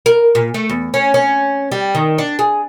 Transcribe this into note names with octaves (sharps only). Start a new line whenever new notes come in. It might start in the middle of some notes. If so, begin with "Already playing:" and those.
A#4
A#2
A3
E2
C#4
C#4
G3
D#3
D4
G#4